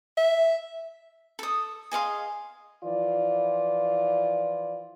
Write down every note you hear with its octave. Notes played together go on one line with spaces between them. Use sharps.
E5
A4 D#6
G#4 D#5 F5 C6
E3 F3 F4 D5